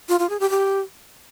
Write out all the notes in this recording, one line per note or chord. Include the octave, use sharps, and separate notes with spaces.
F4
F4
G#4
G4
G4